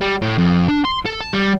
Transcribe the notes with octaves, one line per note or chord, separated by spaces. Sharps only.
G3
A2
F2
D4
C6
A4
A5
G3